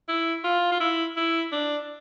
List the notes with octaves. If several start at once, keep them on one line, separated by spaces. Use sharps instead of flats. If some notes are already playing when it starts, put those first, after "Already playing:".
E4
F4
F4
E4
E4
D4